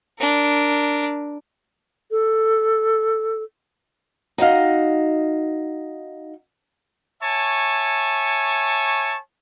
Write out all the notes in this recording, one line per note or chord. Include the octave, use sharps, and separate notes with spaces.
D4 A#4
A4
D#4 F#4 D#5 F5
C#5 E5 G#5 A5 C#6